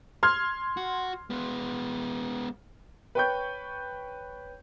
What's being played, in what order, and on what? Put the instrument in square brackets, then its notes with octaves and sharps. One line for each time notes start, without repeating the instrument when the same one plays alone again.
[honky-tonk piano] C6 F6 G#6
[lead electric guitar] F#4
G#3 B3
[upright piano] B4 C#5 G5 B5 C#6 G6